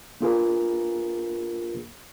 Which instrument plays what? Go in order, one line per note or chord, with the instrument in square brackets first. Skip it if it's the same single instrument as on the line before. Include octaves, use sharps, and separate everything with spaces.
[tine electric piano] A#3 D4 F4 G#4 A#4 B4